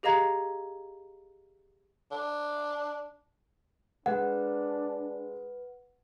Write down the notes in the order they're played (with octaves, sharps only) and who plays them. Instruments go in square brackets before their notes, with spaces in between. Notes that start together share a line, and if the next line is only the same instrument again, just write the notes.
[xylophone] G4 G#4 D#5 F5 A#5 G#6
[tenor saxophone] D4
[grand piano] G#3 [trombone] D4 [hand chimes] B4 [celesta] F#5